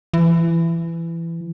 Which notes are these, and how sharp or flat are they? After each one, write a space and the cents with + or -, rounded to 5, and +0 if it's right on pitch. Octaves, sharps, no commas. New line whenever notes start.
E3 +20